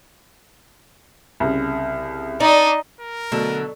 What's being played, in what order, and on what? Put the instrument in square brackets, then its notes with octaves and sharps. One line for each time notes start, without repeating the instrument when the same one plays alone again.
[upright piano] C2 C#3
[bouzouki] D4 [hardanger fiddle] D#4 D#5
[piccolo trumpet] A#4
[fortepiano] B2 F#3 A4 [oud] D3 [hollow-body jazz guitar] A3